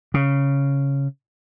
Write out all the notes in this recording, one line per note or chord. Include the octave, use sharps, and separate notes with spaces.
C#3